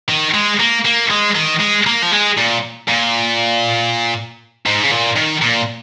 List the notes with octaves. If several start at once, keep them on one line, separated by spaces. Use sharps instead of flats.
D#3
G#3
A#3
A#3
G#3
D#3
G#3
A#3
F3
G#3
A#2
A#2
G#2
C#3
A#2
D#3
A#2